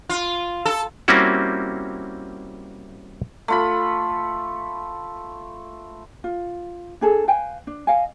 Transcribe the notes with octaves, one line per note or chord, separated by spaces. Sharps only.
F4
A4
G3 A#3 C4 C#4 E4 F#4
A3 F4 B5
F4
D4 G#4 A4
B4 F5 G5 G#5
D4
D#5 F5 G#5